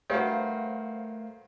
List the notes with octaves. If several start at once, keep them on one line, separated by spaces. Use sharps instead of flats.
G2 A3 F#4 A#4 C5 F5